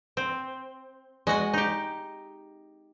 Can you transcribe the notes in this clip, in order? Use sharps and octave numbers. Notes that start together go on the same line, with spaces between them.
C4
G#3 F#4 F#5 G#5
D#4 G4